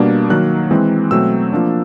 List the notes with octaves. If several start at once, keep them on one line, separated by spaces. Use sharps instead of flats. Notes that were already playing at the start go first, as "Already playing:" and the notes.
Already playing: B2 G3 A#3 D4
D#3 F#3 A#3 F#6
E3 G#3 C4
B2 F#3 A3 C4 E6
F3 A#3 D4